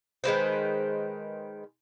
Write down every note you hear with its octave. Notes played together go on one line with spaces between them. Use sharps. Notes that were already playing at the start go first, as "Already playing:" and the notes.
D#3 G#3 B4 C5